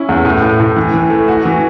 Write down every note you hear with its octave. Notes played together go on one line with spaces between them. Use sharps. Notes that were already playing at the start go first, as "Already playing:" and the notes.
Already playing: C#4 E4
E2
A2
A2
A2
E3
E3
A3
F#4
E3